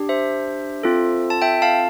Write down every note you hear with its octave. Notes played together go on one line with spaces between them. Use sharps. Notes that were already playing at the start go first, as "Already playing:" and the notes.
Already playing: D4 G4
C5 E5
C4 F4 A4
A5
E5 G5
F5 A5